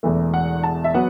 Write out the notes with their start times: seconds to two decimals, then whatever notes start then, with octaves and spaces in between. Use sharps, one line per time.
0.03 E1 E2 E3 A3
0.34 F#5
0.63 A5
0.84 E5
0.94 F#3 B3 F#5